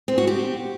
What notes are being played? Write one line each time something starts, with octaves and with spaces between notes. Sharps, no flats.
C4
F#4
G4